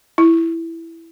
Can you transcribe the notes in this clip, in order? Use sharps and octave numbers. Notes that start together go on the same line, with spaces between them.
E4